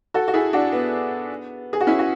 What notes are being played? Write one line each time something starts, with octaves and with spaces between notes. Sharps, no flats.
F#4 A4
F#4
E4 G#4
D4 F#4
B3
G#4
F#4
C#4 E4
F#4